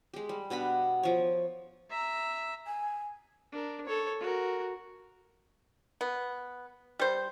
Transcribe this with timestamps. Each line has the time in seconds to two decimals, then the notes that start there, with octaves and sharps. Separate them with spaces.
0.14 G#3 G4
0.29 G3
0.50 B2 B3 D4 B5
1.03 F3 C#5
1.90 E5 A#5
2.67 G#5
3.52 D4 A#4
3.86 A4 C#5
4.20 F#4 A#4
6.01 B3
6.99 G3 C5